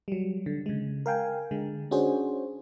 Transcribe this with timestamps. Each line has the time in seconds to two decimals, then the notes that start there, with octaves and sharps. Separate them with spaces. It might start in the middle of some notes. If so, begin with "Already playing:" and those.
0.08 F#3 G3
0.46 D3
0.66 C#3 G#3
1.06 A#4 F5 G5 G#5
1.51 D3 G#3
1.91 C#4 D4 F#4 G#4 C5 C#5